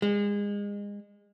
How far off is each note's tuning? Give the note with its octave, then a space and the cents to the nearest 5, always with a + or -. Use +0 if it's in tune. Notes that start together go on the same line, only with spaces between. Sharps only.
G#3 -30